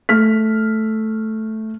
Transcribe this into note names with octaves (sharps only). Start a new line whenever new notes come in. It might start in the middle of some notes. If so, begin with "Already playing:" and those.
A3 F6 B6